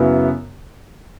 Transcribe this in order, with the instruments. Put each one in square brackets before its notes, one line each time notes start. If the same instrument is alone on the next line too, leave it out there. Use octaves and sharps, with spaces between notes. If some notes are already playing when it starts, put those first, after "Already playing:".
Already playing: [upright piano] F#2 C#3 F#3 B3 E4